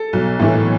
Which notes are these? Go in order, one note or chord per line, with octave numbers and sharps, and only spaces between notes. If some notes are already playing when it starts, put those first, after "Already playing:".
Already playing: A4
B1
A2 E3 A3